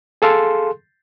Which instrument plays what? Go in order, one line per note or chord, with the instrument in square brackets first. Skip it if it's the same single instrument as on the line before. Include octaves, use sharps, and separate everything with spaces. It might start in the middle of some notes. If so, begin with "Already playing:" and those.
[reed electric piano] G#4 A4 F5 C6